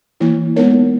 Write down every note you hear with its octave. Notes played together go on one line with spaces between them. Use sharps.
E3 A#3 E4
G#3 B3 D#4 A#4 C#5